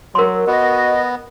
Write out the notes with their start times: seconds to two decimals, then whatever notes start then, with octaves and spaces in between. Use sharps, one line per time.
0.15 F#3 A#4 C6
0.47 B3 F#4 D#5